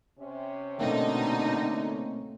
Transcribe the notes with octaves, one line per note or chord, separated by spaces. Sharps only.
C3 C#4
B2 D3 A3 A#3 C4 D#4